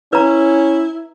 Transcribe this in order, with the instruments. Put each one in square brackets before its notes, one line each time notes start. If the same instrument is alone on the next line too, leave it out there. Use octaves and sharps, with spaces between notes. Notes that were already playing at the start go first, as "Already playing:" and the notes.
[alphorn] C#4 [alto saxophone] E4 [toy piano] B4 A#5